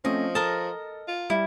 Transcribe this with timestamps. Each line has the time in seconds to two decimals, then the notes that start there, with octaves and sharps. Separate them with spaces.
0.05 F3 A3 C4 C#4 D#5
0.35 A4 A#4 D#5 A5
1.08 F4
1.30 G3 E4